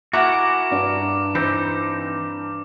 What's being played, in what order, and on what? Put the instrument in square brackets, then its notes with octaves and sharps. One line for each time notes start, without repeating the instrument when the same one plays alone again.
[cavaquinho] E4 F#5 G#5 [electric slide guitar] F#4 A#4 [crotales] D6
[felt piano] G2 D4
[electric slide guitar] E3 C4 D#4 [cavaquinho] C5